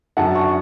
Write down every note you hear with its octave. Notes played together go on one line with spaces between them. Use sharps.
F#2 D3 F#3 C#4 F#5 A5
A5 C#6